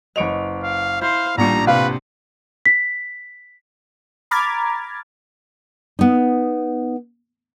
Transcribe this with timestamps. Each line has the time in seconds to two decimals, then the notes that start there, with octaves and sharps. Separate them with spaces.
0.16 F#1 B4 C#5 D#5 D7 F7
0.63 F5
1.01 E4 C5 F5 G6
1.38 A1 A#2 G3 D4 A#5 C#7
1.67 C3 D4 G4 B4 F5
2.66 B6
4.31 A#5 B5 D6 F6 G#6 A6
5.99 B3 D#4